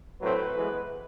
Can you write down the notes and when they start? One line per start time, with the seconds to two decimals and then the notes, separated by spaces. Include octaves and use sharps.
0.20 A2 F#3 A3 C4 B4
0.54 E3 G#3 B3